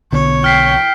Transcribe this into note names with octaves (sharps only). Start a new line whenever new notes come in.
B1 D3 B3 C#5
G5 F6 B6 C7